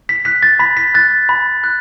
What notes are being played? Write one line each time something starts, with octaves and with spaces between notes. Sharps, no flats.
B6
F#6 B6
A6
B5 B6
B6
F#6 A6
B5
F#6